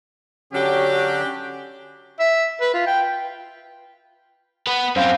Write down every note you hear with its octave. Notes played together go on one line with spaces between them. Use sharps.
D3 F#3 C#4 D4 F#4 G4
E5
B4
F4
G5
B3 B4
F#2 C4 C5 F5 G6